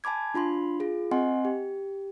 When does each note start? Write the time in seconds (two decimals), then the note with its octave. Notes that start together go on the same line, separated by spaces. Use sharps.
0.04 G#5 A5 B5 D6 G#6
0.34 D4 F4 B5 C6
0.80 F4 G#4
1.11 C4 D#5 F#5 G#5 C6
1.45 G4